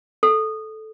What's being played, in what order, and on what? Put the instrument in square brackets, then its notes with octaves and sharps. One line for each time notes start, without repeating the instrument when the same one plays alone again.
[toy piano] A4